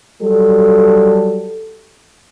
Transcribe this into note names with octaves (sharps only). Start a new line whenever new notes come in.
F#3 G3 A4